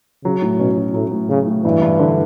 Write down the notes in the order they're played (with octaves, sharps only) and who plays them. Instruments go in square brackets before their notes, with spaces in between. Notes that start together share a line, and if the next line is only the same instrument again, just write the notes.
[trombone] C#3 [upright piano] F#3
[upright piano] A2
[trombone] B2 [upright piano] C#4
[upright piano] F#3
[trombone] A2 [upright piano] F#3
[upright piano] A2
[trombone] C#3 [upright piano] F#3
[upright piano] A2
[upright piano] G2 [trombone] E3
[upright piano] G2
D3